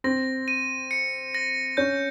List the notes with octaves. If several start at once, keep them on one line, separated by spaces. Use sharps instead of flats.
C4 A#6
D#7
C#7
A#6
C#4 G6